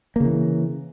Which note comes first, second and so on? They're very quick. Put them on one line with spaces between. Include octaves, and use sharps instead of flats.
A#3 C#3 E3